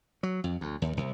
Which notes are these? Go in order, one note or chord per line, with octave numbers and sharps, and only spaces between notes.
F#3
F2
D2
D#2
C2